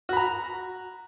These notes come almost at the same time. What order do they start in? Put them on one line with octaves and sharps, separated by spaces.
F#4 B5 A#5